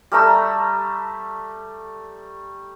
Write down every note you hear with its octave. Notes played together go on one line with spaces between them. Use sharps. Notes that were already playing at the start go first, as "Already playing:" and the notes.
G3 A3 A#5 E6